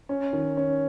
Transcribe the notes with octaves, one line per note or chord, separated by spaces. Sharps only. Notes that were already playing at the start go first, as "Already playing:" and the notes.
C#4
D#3
C#4